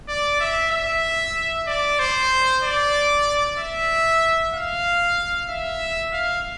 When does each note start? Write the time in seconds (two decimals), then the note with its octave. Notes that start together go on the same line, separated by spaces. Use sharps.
0.08 D5
0.40 E5
0.71 E5
1.67 D5
1.99 C5
2.63 D5
3.58 E5
4.54 F5
5.49 E5
6.13 F5